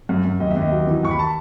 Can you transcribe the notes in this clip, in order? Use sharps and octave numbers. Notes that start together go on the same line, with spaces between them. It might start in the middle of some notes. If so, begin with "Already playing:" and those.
F#2
F#2
D#2 D#5
E5
D#2
D#5
F#3
E3
D#2 C#6
B5
A5